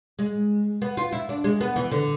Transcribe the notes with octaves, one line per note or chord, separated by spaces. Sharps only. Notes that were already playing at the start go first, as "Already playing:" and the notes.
G#3
B3
F4
E4
D4
G#3
B3
E3
D3